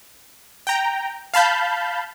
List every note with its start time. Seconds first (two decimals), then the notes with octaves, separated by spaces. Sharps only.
0.67 G5 A#5
1.34 F5 A5 B5 G6